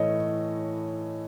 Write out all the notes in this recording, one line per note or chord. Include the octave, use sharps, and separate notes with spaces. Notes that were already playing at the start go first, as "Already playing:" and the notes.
Already playing: A2 E3 A3 C#5 D#5